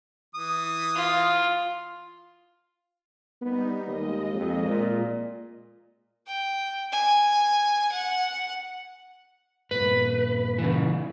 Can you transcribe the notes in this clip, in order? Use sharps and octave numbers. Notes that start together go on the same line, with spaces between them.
E3 D#6
F4
G3 B3 D#4
D#2 G#3 D#5
F2
A#2
G5
G#5
F#5
G2 A#2 B4
C#3 E3